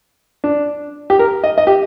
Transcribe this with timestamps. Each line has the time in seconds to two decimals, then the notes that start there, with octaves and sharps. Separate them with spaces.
0.44 D4
1.10 G4
1.19 A#4
1.44 D#5
1.58 D#5
1.67 G4